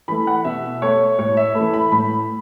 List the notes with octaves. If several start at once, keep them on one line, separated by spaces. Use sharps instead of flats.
E3 A3 B5
F#5
B2 E5
A3 C#5
A2 C#5
E5
E3 A3 B5
B5
A2 B5